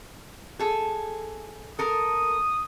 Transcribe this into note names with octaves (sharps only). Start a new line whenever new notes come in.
G#4 A4
A4 A#4 D#6